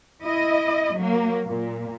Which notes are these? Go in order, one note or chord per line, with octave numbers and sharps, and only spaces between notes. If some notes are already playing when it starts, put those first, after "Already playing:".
E4 D#5
F#3 A#3
A#2